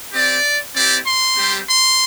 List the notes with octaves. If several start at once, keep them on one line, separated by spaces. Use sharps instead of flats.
C4 G4 D5
C4 E4 G4 D5
C6
G3 C4 G4
C6